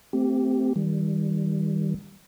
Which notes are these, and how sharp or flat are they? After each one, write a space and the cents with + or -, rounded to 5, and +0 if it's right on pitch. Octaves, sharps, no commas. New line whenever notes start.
A3 +0 C4 -20 G4 -5
D#3 +25 G3 +0